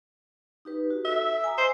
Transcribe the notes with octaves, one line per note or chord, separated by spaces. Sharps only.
D#4 G4 B4
F#4
A4 E5
G#5 A#5 D#6
C5 D#5